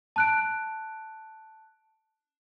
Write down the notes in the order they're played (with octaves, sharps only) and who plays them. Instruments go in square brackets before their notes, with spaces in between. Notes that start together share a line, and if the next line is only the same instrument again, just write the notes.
[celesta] A5 F#6 D7